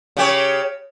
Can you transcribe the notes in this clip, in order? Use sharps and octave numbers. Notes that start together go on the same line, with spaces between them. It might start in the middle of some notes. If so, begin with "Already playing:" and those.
C#3 G4 C#5